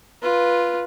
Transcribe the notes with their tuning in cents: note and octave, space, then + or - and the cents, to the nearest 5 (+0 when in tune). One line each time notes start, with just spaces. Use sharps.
F4 -5 B4 -10